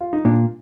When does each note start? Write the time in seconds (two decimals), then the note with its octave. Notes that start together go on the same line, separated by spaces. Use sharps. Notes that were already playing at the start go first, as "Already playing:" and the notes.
0.01 F4
0.13 D#4
0.25 A#2 D4